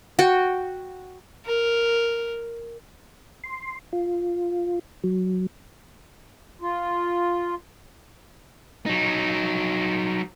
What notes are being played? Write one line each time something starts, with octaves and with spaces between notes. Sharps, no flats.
F#4 G5
A#4
C6
F4
F#3
F4
F#3 D#4